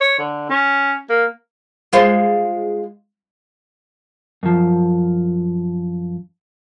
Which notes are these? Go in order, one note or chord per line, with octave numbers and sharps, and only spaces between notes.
C#5
D3
C#4
A#3
G#3 F4 C5
F#2 F3